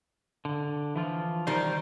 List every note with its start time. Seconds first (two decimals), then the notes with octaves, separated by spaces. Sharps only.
0.45 D3
0.96 E3 F3 F4
1.47 D#3 G3 C5